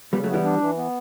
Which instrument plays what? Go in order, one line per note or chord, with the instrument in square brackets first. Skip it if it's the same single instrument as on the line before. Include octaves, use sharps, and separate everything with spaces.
[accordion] C#3 [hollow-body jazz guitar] G3 B3
[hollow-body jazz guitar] F#3 A3
[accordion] B3
[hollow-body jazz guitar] E3 G3
[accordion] D4
E3
B3